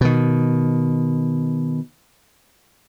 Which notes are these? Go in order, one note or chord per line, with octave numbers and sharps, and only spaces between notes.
B2 D#3